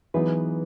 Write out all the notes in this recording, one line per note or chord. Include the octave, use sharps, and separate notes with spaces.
E3 F#3 B3 D#4 G#4 B4